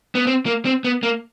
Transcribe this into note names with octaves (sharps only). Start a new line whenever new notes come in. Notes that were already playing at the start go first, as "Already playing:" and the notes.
B3
C4
A#3
C4
B3
A#3